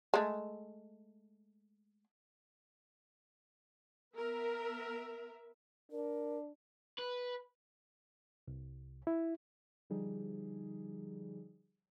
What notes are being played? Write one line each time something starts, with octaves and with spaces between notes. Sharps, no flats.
G#3 A3
B3 A#4 E5
D4 A#4
B4
C2
E4
D3 F3 G3 D#4 G#4